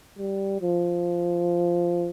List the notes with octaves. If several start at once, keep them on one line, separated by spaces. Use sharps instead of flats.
G3
F3